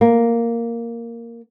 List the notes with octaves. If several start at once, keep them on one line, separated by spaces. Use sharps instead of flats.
A#3